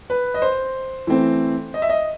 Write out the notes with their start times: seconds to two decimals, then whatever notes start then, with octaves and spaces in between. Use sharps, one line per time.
0.10 B4
0.34 D#5
0.42 C5
1.07 E3 A3 C4
1.74 D#5
1.82 E5
1.89 D#5